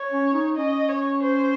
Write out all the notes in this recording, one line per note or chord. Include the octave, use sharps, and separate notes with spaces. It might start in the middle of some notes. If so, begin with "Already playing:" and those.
Already playing: C#5
C#4
D#4
C#4 D#5
C#5
C5